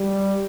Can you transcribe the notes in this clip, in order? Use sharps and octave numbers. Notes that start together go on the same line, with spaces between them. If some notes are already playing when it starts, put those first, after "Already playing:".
Already playing: G3